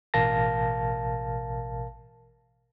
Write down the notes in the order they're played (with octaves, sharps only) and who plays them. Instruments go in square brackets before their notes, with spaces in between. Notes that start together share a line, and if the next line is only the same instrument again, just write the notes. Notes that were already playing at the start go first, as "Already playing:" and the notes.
[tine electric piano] A1 B2 A#4 F5 A5 A#6